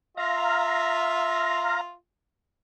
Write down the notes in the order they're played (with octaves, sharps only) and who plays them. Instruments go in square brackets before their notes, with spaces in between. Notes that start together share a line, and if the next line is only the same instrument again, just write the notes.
[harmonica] F4 E5 [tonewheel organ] F5 A#5